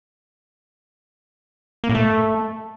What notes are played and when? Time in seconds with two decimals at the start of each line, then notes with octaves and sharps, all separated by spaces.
1.84 A#3
1.89 A2
1.95 A3